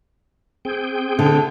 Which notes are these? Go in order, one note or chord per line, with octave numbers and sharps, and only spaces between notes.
C4 G#4 G5
D3